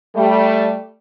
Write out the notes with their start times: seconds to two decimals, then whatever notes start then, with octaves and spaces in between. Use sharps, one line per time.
0.16 G3 A3